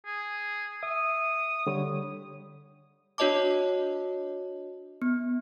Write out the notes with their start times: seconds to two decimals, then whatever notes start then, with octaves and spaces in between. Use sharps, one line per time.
0.06 G#4
0.83 E5 D#6
1.67 D3 G3 C#5
3.18 D4 F#4 C#5 D#5 A5 D6
5.02 B3